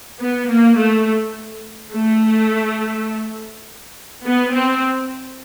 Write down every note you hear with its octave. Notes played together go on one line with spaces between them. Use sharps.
B3
A#3
A3
A3
B3
C4